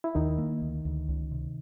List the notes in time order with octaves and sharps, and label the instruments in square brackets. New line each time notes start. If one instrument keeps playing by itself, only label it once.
[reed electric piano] E4
[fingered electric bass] D#2 [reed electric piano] D#3 D#4
[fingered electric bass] A#3
D2
D2
C#2
C3